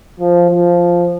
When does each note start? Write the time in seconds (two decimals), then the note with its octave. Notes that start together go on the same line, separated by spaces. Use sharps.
0.20 F3
0.50 F3